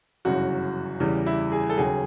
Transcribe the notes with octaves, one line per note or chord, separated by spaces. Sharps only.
G1 F#2 C#3 E3 F#4
E2 C#3 E3 G3
E4
G#4
A4
D#2 C#3 F#3 G#4